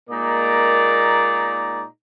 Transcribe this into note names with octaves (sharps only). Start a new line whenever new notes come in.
A#2 G#3 A#3 D#4 D5 A#5